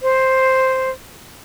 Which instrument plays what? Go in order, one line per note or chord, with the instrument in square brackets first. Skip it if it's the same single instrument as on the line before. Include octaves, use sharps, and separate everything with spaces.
[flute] C5